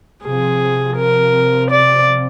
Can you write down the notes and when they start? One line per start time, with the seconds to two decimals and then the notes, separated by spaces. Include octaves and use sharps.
0.24 C3 F3 C4 G#4
0.97 A#4
1.71 D5